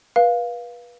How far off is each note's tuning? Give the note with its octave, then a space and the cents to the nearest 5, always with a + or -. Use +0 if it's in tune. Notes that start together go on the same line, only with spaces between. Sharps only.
B4 -30 F5 +0